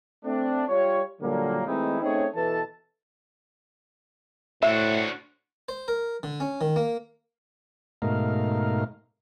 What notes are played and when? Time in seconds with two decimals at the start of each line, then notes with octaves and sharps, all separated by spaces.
0.25 A3 C4 D4
0.68 G3 F4 G4 C#5
1.21 A#2 D3 F#3 G3 A#3
1.66 E3 G#3 A3 C4 D#4 E4
2.01 A3 C4 C#4 D#4 G#4 C#5
2.36 B2 E3 A4 B4 A5
4.63 A2 B3 D4 F#4 C5 E5
5.69 C5
5.88 A#4
6.23 D3
6.40 C#4
6.61 D#3
6.76 A#3
8.02 G#2 B2 A3 D#4 A#4 F5